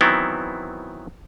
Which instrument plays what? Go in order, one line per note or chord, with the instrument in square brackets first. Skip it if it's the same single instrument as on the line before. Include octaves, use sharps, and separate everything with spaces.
[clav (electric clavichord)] D#3 E3 F#3 B3 C4 E4